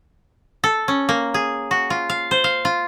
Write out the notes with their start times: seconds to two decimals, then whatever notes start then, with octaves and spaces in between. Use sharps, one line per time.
0.64 A4
0.88 C#4
1.09 A#3
1.34 G#4
1.71 F#4
1.90 F4
2.09 F5
2.31 C5
2.44 F5
2.65 F4